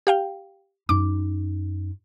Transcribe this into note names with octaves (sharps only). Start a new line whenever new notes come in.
G4 F5 G5
F#2 D#4 D6